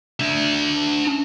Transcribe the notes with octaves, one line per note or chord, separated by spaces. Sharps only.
D4 E5